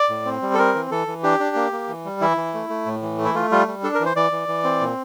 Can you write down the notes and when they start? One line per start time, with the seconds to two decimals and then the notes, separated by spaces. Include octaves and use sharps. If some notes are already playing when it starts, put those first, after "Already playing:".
Already playing: D5
0.10 A2
0.26 C4
0.42 G3
0.54 A4
0.58 C4 A#4
0.75 E3
0.91 E3 A4
1.07 E3
1.23 D4 G4
1.40 D4
1.56 A#3
1.72 A#3
1.88 E3
2.05 G3
2.21 E3 E4
2.37 E3
2.54 A3
2.70 A3
2.86 A2
3.02 E3
3.18 A3
3.25 E4
3.35 A3 F4
3.52 G3 F4
3.68 G3
3.83 D4 A4
3.95 A#4
4.00 E3
4.06 C5
4.16 E3 D5
4.32 E3
4.48 E3
4.64 C4
4.81 A#2